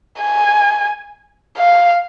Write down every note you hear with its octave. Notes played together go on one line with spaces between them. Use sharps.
G#5
F5